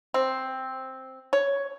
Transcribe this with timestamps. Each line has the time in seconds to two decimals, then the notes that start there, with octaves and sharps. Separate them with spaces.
0.14 C4
1.33 C#5